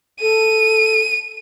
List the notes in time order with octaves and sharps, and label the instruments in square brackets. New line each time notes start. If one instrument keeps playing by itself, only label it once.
[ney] A4 [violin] D#7